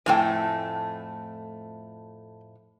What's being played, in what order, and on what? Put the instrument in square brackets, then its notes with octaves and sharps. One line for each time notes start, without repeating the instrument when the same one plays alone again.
[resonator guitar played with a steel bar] F2 A2 A3 [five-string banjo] G5 G#5